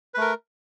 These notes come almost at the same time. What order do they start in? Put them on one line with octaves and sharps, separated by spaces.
B4 A3 A#4